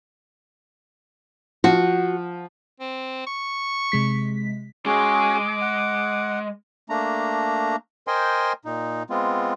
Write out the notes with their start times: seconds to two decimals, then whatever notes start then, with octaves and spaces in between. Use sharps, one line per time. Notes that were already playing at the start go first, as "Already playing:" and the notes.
1.64 F3 F#4
2.80 C4
3.27 C#6
3.92 C3 G#3 B6
4.86 G#3 C#4 F#4 G#4 D6
5.61 F#5
6.89 A3 A#3 D4 A#5
8.07 A#4 C5 D#5 G5 G#5 C6
8.65 A#2 D#4
9.10 G#3 B3 C4 F4